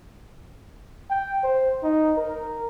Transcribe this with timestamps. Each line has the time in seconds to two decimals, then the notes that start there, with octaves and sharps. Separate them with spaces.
1.10 G5
1.43 C5
1.83 D#4
2.17 A#4